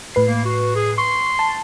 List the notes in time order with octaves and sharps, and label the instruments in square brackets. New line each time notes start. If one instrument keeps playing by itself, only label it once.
[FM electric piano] A2 B4 C7
[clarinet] A#3
F#4
G#4
[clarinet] C6 [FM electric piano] C#6
[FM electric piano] A5